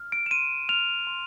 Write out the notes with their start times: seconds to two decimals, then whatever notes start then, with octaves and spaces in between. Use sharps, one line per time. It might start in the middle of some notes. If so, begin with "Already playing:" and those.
Already playing: F6
0.12 D7
0.26 E7
0.31 C6 D#7
0.69 F6 F7
1.07 C6